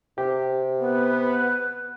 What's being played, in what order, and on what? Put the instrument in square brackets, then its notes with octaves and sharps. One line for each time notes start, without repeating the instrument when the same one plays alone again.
[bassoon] C3 [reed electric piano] G4
[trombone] B3 [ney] B4